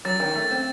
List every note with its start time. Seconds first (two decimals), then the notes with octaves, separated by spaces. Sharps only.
0.05 F#3 A6
0.20 D#3
0.36 A3
0.51 C4